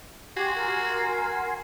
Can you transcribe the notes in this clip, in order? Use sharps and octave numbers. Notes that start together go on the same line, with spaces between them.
F#4 G4 G#5 C6
A#4
F#5